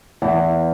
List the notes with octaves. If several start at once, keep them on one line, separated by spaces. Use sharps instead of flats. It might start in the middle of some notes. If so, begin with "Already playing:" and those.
E2